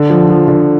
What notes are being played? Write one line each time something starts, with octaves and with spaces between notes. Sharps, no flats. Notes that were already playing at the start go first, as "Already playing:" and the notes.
Already playing: D3
F3
F3
D3